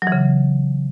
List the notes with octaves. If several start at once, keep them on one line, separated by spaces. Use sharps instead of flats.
F#3
E3
C#3